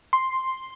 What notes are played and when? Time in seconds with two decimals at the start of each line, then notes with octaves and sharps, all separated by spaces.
0.13 C6